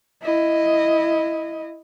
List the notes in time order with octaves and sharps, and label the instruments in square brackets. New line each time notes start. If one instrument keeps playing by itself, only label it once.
[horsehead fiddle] E4 D#5